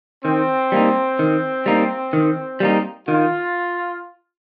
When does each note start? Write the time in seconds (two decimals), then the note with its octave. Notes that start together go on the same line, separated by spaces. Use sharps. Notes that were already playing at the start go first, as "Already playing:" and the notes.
0.25 D#3 C4
0.72 G3 A#3 D#4
1.19 D#3
1.66 G3 A#3 D#4
2.13 D#3
2.60 G3 A#3 D#4
3.08 D#3 F4